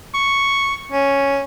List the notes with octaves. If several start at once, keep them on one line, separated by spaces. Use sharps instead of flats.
C#6
C#4